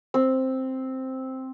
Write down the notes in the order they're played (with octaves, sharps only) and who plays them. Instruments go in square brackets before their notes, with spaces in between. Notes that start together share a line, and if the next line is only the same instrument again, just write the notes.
[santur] C4